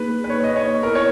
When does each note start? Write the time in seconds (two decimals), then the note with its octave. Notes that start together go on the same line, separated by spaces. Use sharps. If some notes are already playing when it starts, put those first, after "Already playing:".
Already playing: A#3 D#4 G#4 B4
0.24 B4
0.30 C#5
0.44 D#5
0.56 C#5
0.82 B3 E4 A#4 B4
0.95 C#5